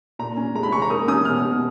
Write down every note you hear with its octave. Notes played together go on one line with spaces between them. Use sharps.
A#2 A#5
C#4
G#3 A#5
B5
G#3 C#6
A#5
A#3 D#6
C#4 D#6
B2 F6
B2